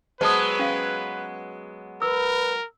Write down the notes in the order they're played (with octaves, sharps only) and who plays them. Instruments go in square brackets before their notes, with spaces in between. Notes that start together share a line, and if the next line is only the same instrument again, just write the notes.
[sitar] F#3 G#3 B3 [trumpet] B4 [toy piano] C5 A5 D#6
[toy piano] C#4 F5
[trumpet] A#4 [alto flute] B4 [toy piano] E6